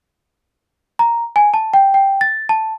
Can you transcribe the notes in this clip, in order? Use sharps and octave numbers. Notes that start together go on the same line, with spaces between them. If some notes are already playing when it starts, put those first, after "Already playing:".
A#5
G#5
A5
G5
G5
A6
A5